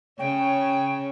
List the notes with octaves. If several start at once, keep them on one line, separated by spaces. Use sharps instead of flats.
C#3 C#5 G5